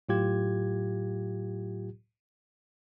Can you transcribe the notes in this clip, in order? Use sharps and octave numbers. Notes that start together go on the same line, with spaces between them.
A2 F#3 F4 G4 G#6